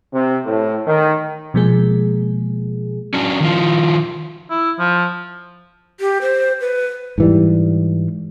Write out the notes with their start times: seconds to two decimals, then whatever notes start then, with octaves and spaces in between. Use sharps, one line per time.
0.14 C3
0.46 A2
0.87 D#3
1.54 B2 F3 G#3 A#3 G#4
3.14 C#4 D4 F#4
3.40 D#3 F3 F4
4.50 E4
4.79 F3
6.00 G4
6.21 C5
6.61 B4
7.18 G#2 E3 G3